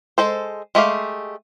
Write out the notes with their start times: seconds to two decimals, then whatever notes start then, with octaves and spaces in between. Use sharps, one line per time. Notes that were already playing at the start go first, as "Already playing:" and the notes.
0.18 G#3 A4 C5
0.75 G#3 A3 G4 F5